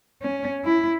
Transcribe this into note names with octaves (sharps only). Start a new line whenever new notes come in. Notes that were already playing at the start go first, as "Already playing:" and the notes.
C#4
E4